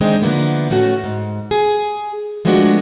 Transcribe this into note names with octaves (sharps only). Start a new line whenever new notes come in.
D#3 G#3 C4 D4 D#4
D3 F3 A#3 B3 E4
A2 A3 C#4 F#4
G#2
G#4
F3 G#3 A3 B3 D4 F#4